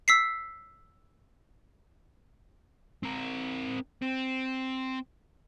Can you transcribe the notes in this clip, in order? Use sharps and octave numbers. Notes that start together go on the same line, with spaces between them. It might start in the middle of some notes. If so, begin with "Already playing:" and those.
E6 B6 C7
C4 A#4
C4